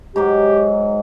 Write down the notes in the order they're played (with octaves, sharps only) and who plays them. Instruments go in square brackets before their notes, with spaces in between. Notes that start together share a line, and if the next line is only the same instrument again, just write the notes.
[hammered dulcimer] G#2 F#3 [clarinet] G4